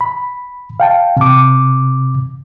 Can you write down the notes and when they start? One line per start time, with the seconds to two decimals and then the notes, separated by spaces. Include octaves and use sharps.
0.01 B5
0.80 F5 G5 A5
1.17 C3 D6